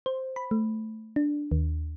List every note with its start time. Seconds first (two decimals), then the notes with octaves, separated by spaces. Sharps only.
0.06 C5
0.36 B5
0.51 A3
1.16 D4
1.52 D#2